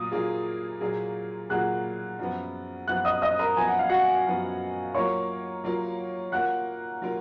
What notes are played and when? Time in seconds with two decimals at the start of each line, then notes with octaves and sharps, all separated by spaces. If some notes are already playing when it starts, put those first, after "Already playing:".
Already playing: A#2 F#3 A#3 F4 D#6
0.11 A#2 F#3 A#3 F4 G#4
0.80 A#2 F#3 A#3 F4 G#4
1.49 A#2 F#3 A#3 F4 G#4 F#5 F#6
2.19 F#2 F3 B3
2.88 F#2 F3 B3 F#5 F#6
3.05 D#5 D#6
3.22 D#5 D#6
3.39 A#4 A#5
3.56 F#2 F3 B3 G#5
3.68 F#5
3.79 F5
3.89 F#4 F#5
4.26 F#2 F3 B3
4.94 F#3 A#3 F4 A#4 C#5 C#6
5.64 F#3 A#3 F4 A#4
6.32 F#3 A#3 F4 A#4 F#5 F#6
7.02 F#3 A#3 F4 A#4